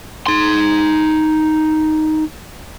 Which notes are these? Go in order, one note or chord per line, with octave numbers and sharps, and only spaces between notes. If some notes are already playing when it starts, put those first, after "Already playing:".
D#4 C6